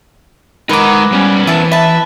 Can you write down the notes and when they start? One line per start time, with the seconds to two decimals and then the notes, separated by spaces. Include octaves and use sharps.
0.69 G#3 D#4 A#4 B4 F#5 D6
1.12 G3 B3 C#4
1.47 E3 E5 A5
1.72 B4 E5 A5